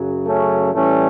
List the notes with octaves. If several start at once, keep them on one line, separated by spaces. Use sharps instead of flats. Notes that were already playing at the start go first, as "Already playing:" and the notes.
Already playing: F#2 C#3 F#3
A3 C#4
A2 E3 G3 A3 C#4